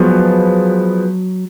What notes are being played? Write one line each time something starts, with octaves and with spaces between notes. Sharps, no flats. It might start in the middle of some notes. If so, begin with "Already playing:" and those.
Already playing: F3 F#3 G#3 B3